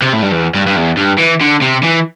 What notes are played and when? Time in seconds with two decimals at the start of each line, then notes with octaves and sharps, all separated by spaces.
0.02 C3
0.13 A2
0.22 G2
0.32 E2
0.55 G2
0.67 G2
0.76 E2
0.97 G2
1.19 E3
1.41 D3
1.62 C3
1.83 E3